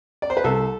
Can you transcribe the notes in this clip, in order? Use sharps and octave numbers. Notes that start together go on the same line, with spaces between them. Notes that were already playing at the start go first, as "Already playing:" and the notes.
D5
C5
B4
C2 A4